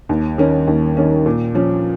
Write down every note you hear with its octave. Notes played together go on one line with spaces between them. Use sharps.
D#2
D#3 A#3 C#4
D#2
D#3 A#3 C#4
A#2
F3 C#4